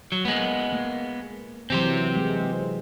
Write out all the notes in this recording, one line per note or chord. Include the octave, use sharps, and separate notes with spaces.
F#3
G#3 A#3 B3
A#3
C3 E3 F#3 C4 G4 C5
G#3